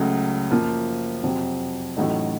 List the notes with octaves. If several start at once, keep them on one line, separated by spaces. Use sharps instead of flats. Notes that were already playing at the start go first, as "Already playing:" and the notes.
Already playing: C#2 C#3 F#3 A3
F#2 F3 A#3
F2 C3 F#3
A1 A2 F#3 A3 D#4